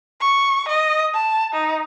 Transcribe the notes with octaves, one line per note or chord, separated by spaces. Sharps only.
C#6
D#5
A5
D#4